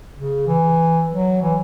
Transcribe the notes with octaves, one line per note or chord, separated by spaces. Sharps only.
C#3
E3
F#3
E3